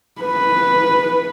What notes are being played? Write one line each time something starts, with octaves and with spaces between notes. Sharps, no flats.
B4